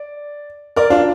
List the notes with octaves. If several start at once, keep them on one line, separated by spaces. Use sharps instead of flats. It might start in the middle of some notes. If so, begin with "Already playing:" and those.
Already playing: D5
A#4 D5
D4 F4